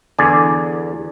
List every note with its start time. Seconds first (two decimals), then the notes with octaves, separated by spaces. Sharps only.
0.18 E2 D3 D5 G#5